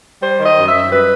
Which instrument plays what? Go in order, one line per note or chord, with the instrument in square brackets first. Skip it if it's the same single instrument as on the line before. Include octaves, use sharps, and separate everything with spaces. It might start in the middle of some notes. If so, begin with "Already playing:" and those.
[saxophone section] G3 C5
D#3
D#5
F#2
E5
F#2
G3 B4